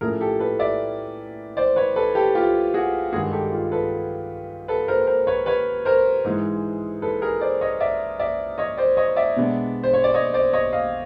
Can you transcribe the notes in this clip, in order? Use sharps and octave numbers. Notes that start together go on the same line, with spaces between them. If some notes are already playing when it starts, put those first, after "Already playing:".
A2 F3 A3 C#4 G#4 A#4
G4 A4
A4 B4
D5 E5
C5 D5
B4 C#5
A4 B4
G4 A4
F4 G4
F#4 G#4
G2 D#3 G#3 F#4 G#4
G4 A4
F4
A4 B4
A4 B4
A#4 C5
A#4 C5
B4 C#5
B4 C#5
A#4 C5
G#2 E3 G#3
A4 B4
G#4 A#4
C5 D5
C#5 D#5
D5 E5
D5 E5
C#5 D#5
C5 D5
C#5 D#5
D5 E5
B2 G#3 B3 D4
C5
C#5
D5
C#5 D#5
C5 D5
C#5 D#5
D#5 F5